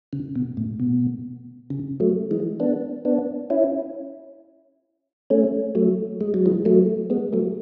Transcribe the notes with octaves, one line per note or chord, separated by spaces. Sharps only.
C#3
B2
A2
B2
C#3
F#3 A3
E3 G#3
B3 D4
B3 D4
C#4 E4
A3 C#4
F#3 A3
G#3
F#3
E3 G#3
F#3 A3
G#3 B3
F#3 A3